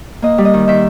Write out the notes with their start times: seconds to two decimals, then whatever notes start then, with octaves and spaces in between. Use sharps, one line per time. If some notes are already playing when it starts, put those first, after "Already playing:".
0.22 A#3 D#5
0.38 G3
0.45 D#5
0.54 D#3
0.68 D#3 E5